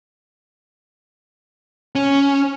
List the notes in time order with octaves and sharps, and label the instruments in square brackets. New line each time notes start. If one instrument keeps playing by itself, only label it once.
[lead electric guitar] C#4